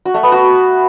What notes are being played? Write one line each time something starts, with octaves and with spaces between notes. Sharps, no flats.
F#4
A3
B3
F#4